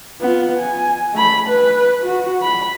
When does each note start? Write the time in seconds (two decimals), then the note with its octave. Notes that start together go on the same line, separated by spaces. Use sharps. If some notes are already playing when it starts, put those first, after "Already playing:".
0.21 B3 F4
0.58 G#5
1.13 A3 B5
1.49 B4
2.04 F#4
2.42 B5